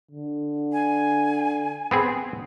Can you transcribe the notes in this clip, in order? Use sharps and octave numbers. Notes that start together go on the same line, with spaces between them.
D3
G#5
B3 C4 G#4